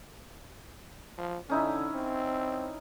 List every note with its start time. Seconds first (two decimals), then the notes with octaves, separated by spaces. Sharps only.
1.18 F3
1.50 D3 C#4 D#4 E4
1.94 C4